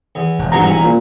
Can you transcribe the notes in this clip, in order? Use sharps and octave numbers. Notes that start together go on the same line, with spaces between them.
E2
E1
G#1 G2 F3 F#3 A#5
C#4 E4
A#2